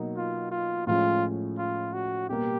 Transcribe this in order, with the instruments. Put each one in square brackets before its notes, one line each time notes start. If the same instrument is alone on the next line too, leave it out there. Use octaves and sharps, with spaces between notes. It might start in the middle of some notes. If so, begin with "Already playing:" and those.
Already playing: [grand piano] B2 F#3 A#3 D#4
[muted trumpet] F4
F4
[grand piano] A2 F3 G#3 C#4 [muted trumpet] F4
[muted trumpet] F4
F#4
[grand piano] B2 G3 A#3 [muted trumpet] G4